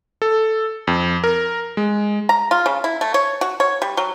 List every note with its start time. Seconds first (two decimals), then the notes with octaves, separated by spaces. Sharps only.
0.22 A4
0.87 F2
1.24 A#4
1.77 G#3
2.29 A#5
2.51 F4
2.66 C#3
2.84 E4
3.01 A3
3.14 C#5
3.41 F#4
3.60 C#5
3.82 G3
3.97 F#3